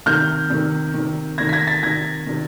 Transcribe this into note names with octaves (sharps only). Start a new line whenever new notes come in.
C3 D#3 F6 G6
C3 D#3
C3 D#3
C3 D#3 G#6 A#6
B6
G#6 A#6
A6 B6
C3 D#3 G#6 A#6
C3 D#3